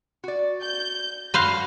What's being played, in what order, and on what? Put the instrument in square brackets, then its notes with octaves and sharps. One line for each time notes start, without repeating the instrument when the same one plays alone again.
[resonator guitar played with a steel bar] F#4 D5
[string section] G6
[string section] F#2 F#4 A#6 [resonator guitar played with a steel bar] D3 [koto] B4 C5 F5